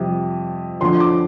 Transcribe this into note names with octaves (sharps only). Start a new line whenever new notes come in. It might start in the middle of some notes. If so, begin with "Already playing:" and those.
Already playing: F2 C3 G3
F2 D3 F3 C6
D6